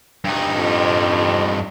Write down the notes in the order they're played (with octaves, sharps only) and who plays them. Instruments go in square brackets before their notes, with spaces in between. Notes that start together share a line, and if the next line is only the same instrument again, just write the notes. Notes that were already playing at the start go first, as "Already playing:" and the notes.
[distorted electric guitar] G2 D#4
[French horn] F2